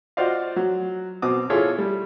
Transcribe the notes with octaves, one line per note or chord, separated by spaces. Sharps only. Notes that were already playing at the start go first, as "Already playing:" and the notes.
F4 F#4 C5 D5 D#5 F5
F#3
B2 C4 D6 D#6
E4 F4 G#4 A4 C#5 E5
G3